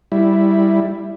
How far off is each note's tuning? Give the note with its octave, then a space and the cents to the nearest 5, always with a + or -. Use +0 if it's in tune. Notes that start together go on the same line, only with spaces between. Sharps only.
G3 +0 E4 +0